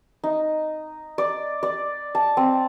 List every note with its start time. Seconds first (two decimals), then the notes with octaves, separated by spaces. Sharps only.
0.24 D#4
1.18 D5
1.63 D5
2.15 A5
2.37 C4